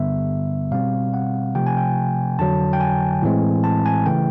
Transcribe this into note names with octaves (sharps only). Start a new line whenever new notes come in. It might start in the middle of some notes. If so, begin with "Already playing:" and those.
Already playing: G2 D3 G3 B3 E5
B2 G3 C4 F5
F#5
C3 F3 A3 G5
G#5
G5
F2 D3 F#3 A5
G5
G#5
A2 E3 G#3 C4
A5
G#5
C#3 E3 A3 G5